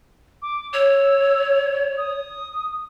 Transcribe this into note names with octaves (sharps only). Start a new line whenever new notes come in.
D6
C#5 E6
D#6